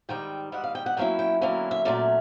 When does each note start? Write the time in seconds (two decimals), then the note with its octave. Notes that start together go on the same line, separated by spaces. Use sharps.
0.09 G#2 D#3 G3 G5
0.52 G#2 D#3 G3 F#5
0.64 F5
0.75 G5
0.86 F#5
0.97 D3 F#3 A#3 C#4 E4 G5
1.19 G5
1.41 D3 F#3 A#3 C#4 E4
1.71 E5
1.85 A#2 F#3 A3 C#4 D5